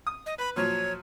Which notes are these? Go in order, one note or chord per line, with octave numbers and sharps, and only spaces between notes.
D#6
D#5
B4 B5
A#2 F3 F#3 C#5